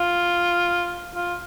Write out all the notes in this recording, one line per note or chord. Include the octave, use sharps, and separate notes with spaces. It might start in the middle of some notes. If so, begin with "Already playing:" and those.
Already playing: F4
F4